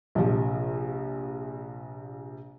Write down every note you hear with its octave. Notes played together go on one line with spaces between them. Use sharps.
A#1 C3 F3